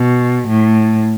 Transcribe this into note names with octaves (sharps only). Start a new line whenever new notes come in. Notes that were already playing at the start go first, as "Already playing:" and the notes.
Already playing: B2
A2